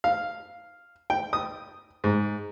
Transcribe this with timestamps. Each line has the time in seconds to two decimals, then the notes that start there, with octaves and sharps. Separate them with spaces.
0.04 F5
1.10 G5
1.33 D#6
2.04 G#2